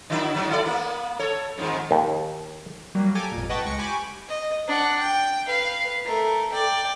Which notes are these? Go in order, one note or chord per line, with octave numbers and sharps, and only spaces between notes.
D3 F#3 E4
G#2 B2 F#3
E4 A4 D5
A#3 B3
A4 C#5
F2 G#2 D#3
D#2
F#3 G3 A#3
G4 A4 G#5 A#5 D6
G#1 F2 A#2
B4 D#5 F#5 G5 A5 C#6
C#2 G#3 C#6 A#6 C#7
G4 G#5 B5 C#6 D6
D#5
D4 F#5
G5
B4 F5
A3 A#4
D5 G5